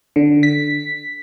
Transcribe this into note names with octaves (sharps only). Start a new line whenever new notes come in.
D3
B6